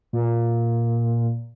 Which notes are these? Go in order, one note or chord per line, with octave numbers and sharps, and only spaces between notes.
A#2